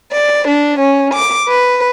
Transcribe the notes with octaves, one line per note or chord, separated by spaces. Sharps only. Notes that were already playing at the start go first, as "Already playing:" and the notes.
D5
D4
C#4
D6
B4